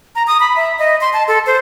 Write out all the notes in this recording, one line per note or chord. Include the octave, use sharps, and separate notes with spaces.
A#5
D#6
B5
E5
D#5
C6
A5
A4
C5